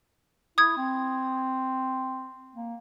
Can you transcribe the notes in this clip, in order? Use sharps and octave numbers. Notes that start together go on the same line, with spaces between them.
E4 D#6 G#6
C4
A#3